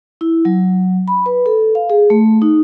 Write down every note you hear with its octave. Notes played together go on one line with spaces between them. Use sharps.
E4
F#3
B5
B4
A4
F5
G#4
A3
D#4